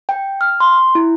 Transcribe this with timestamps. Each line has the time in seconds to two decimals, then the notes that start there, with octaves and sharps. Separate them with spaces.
0.09 G5
0.41 F6
0.60 C6
0.95 E4